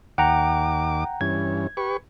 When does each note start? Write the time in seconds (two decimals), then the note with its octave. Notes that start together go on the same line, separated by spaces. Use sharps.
0.18 D#2 F#5 G5 A#5 D6
1.21 G2 E3 C#4 G#6
1.77 G4 B4 C#6